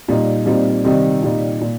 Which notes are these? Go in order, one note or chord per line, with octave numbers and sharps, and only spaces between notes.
A#2 G3 D#4
A#2 G3 C4 D#4
C3 D#3 G3 D#4
A#2 G3 D#4
A#2